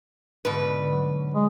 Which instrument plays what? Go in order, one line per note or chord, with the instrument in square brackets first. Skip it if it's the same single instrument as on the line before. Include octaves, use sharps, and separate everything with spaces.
[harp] G#2 D3 [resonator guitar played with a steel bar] B2 B4
[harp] F#3
[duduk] G#3